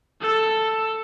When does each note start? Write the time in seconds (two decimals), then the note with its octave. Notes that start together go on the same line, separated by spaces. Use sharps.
0.21 A4